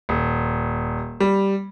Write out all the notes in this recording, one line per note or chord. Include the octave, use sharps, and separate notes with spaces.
D#1
G3